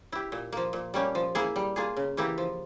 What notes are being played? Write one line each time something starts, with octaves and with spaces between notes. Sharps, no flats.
E4 G4
A#2
F3 A#3
A#2
G3 A#3 C#4 G4
F3
A#3 E4 G#4
G3
A#3 F4 G#4
C#3
E3 A#3 E4 G4
F3